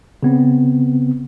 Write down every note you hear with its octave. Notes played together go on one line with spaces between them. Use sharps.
C#3 B3 C4